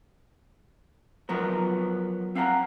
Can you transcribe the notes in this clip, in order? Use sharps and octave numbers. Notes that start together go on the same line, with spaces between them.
F3 F#3 B3 A#4
C4 F5 F#5 A5 A#5